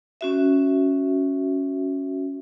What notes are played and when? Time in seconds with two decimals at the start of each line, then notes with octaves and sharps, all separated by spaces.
0.21 C#4 F#4 E5